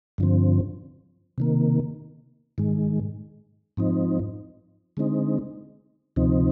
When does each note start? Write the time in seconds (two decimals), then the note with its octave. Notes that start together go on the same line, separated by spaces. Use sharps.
0.18 G2 D3 F3 C4
1.38 C3 D#3 A#3
2.58 G#2 D#3 G#3
3.77 G#2 F3 C4 D#4
4.97 D3 G#3 C4 D#4
6.16 D2 C3 F3 C4 D#4